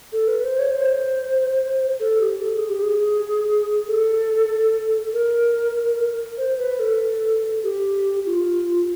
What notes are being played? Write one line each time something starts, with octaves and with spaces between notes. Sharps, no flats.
A4
B4
C5
C#5
C5
A4
G4
A4
G#4
G4
G#4
A4
A#4
C5
B4
A4
G4
F4